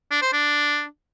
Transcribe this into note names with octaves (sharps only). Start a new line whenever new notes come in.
D4
C5
D4